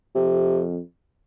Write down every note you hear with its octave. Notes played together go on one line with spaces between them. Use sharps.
F2 C3